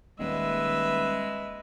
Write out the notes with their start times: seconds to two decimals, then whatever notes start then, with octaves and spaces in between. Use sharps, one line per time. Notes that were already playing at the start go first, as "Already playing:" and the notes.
0.19 D#1 G#3 B4 E5